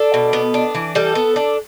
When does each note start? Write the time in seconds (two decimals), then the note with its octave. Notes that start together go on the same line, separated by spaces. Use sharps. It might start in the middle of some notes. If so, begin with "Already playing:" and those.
Already playing: D4 A4
0.14 B2
0.33 B3
0.54 D4
0.75 E3
0.95 G3 A4
1.15 B3
1.36 D4